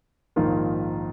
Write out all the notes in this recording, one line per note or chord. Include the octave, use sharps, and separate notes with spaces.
A#1 G#2 D#3 A#3 F4